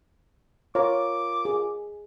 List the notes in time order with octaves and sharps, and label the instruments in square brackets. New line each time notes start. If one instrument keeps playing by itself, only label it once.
[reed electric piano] F4 A#4 [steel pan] C#5 [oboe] D6
[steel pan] G#4